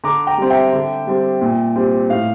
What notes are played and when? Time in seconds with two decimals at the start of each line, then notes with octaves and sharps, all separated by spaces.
0.04 D3 A#5 D6
0.27 G5 A#5
0.38 G3 C4
0.50 E5 G5
0.73 D3
1.07 G3 C4
1.41 A#2
1.76 G3 C4
2.09 A2 F5